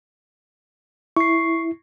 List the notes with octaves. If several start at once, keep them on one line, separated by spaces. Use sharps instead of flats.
E4 C#6 C7